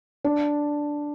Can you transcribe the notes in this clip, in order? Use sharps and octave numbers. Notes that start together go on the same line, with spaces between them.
D4